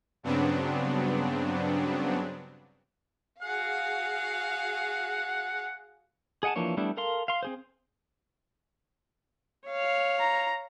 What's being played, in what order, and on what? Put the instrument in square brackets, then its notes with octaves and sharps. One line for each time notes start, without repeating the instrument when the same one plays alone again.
[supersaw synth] G2 C#3 F#3 B3 C4 D4
[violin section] F#4 G#4 F5 [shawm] F#5
[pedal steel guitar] G#4 D#5 F#5 G#5 A5
E3 F3 A#3 D4 C#5
G3 A3 B3 D4 E4
A4 A#4 F5 C6
F5 C6
C4 G#4 C5
[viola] C#5 F5
[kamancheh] A#5